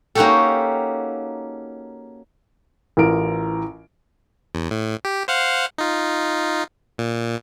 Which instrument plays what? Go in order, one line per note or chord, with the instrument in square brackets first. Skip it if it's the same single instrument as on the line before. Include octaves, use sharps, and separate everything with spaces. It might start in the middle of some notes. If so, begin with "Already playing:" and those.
[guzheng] A#3 C#4 D#4 F#4 G4 A4
[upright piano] A1 E3 F4 A#4 D7
[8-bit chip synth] E2
A2
G4
C5 F5 F#5
D#4 F4
A#2